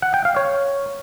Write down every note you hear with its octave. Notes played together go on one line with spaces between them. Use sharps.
F#5
G5
F5
C#5